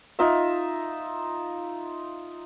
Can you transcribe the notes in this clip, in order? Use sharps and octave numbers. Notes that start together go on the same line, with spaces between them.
D#4 F4 E5